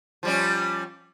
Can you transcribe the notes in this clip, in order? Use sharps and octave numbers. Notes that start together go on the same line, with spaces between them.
F3 G3 C#4